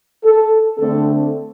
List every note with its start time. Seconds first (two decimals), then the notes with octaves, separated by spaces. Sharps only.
0.24 A4
0.79 D3 A3 C4 A4